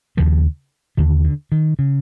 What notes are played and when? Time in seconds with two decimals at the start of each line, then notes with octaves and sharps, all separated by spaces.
0.17 D#2 C#3 F3
0.97 D#2 D3 D#3
1.24 D3
1.52 D#3
1.79 C#3